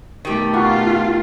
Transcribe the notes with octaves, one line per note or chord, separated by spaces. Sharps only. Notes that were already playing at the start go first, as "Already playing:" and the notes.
B2 D#3 A3 G4
A#3 F4 F#4 C#6